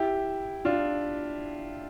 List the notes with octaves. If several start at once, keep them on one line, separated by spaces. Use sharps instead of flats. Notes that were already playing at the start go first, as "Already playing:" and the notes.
Already playing: E4 G4
D4 F4